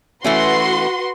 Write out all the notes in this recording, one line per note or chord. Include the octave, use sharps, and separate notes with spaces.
E3 A3 C#4 F#4 B4 C6